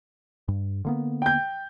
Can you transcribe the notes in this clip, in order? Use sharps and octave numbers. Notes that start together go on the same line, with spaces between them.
G2
D3 A#3 B3
G5 G6